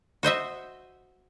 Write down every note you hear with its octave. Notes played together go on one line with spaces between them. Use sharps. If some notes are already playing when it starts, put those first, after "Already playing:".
F#4 C5 D#5 E5